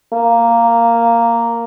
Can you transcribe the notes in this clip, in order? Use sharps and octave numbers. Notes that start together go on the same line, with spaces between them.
A#3